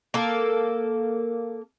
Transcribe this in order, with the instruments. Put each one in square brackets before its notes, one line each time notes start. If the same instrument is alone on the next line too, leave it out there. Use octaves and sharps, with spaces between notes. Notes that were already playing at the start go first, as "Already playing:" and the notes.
[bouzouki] A#3 A4